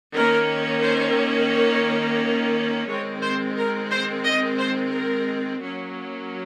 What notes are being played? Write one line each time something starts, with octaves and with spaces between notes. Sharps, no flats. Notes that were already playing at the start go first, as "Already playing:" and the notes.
D#3 A#3 C#4 A#4
C5
C#5
D#3 G#3 C4 C#5
C5
A#4
C5
D#5
C5
A#4
F#3 A#3 C#4